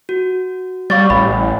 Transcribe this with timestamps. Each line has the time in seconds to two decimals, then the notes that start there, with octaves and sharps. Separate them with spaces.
0.09 F#4
0.90 G3 C#5 F5 C#6 A6
1.10 A1 B5